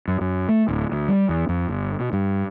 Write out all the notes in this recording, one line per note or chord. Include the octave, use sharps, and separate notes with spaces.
F#2
F#2
A3
D1
D2
G3
E2
F2
G1
B2
G2